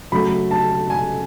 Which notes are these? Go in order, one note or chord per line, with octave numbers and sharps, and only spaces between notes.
C#3 F#3 A3 B5
A5
G#5